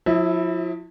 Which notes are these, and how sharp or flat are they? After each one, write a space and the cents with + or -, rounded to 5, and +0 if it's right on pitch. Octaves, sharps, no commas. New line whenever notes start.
F3 +40 E4 +0 E5 -25